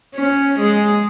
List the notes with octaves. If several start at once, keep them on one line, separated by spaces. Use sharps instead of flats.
C#4
G#3